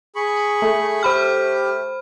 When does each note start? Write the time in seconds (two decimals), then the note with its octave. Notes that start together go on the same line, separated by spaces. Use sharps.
0.16 G#4 B5 C#6
0.62 A3
1.03 G4 C5 B5 F6